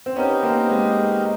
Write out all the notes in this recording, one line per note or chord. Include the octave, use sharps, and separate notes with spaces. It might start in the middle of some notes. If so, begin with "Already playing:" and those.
C4
B3 C#4 D#4 G4 A#4
A#3 C4
G#3